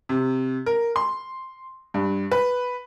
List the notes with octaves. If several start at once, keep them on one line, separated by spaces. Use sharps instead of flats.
C3
A#4
C6
G2
B4